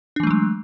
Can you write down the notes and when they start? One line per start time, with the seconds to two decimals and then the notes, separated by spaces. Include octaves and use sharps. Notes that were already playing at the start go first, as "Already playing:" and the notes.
0.16 D4
0.20 E3
0.23 A3
0.27 F#3
0.31 G#3